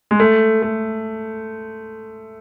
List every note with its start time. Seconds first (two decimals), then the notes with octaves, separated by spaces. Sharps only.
0.11 G#3
0.20 A3
0.62 A3